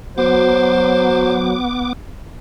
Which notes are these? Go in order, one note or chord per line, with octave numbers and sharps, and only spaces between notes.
F#3 B3 C5 D6